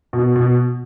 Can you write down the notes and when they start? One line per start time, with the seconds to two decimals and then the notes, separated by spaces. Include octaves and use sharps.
0.13 B2
0.36 B2